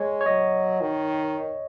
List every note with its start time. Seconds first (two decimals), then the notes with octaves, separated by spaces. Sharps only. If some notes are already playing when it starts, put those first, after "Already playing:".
Already playing: G#3 C#5
0.21 C#5
0.26 F#3 D#5
0.81 D#3